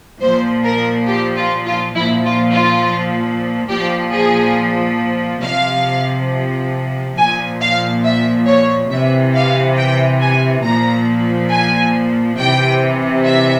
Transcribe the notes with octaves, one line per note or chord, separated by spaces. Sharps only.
A#2 F3 C5
A#4
G4
F4
F4
A#2 F3 E4
F4
F4
A#2 F3 G4
G#4
C3 F3 F5
A#2 F3 G#5
F5
E5
C#5
C3 E3 E5
F5
G5
G#5
A#2 F3 A#5
G#5
C3 E3 G5
E5